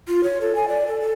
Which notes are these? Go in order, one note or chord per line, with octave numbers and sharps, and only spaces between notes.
F4
C#5
A4
G#5
D5
A4
A4